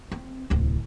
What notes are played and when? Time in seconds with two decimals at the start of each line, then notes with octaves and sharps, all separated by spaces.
0.12 C4
0.50 D1 C2